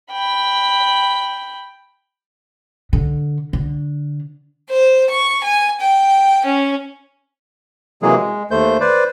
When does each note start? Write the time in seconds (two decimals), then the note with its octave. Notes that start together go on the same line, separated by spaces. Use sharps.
0.12 G5 B5
2.93 D3
3.53 D3
4.70 C5
5.10 C#6
5.44 G#5
5.80 G5
6.45 C#4
8.02 C3 E3 F#3 G#3 A#3 G#4
8.15 G#3
8.51 D#2 A3 C5 G6
8.80 B4 C5 D5